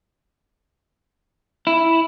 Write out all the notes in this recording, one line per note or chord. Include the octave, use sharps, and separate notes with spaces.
E4